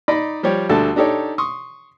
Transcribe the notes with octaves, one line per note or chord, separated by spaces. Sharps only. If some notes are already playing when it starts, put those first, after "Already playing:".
D#4 D5 D#5 B5
F3 G3 G4 C#5
D2 D3 G3 A4 A5
D4 D#4 G4 A4 C#5 D5
C6 C#6 D#6